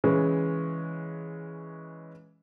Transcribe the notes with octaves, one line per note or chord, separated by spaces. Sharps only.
C#3 E3 G#3 C#4